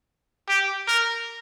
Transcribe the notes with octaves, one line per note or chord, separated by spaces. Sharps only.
G4
A#4